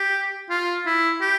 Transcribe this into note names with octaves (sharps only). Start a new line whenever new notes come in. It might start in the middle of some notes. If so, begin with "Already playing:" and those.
Already playing: G4
F4
E4
G4